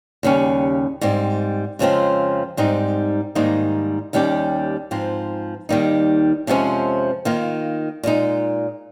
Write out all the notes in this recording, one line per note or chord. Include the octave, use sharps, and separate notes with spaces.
D#2 C#3 G3 C#4
G#2 G3 C4
F2 C#3 F3 G#3 C4
G#2 G3 C4 D#4
G#2 D#3 G3 A#3 D#4
D#2 D#3 G3 C#4 G4
G#2 F3 C4
D#2 D#3 G3 A#3 D#4
F2 C3 F3 G#3 C#4
D#3 A#3 F4
A#2 G#3 D#4